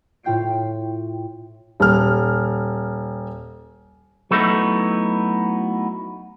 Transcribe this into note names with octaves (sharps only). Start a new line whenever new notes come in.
A2 F4 G5 G6 C7 D7
D#1 F6
F#3 A3 B3 D#4 E4